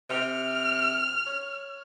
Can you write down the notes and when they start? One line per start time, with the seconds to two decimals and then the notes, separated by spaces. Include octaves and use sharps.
0.10 C3 F6
1.26 C#5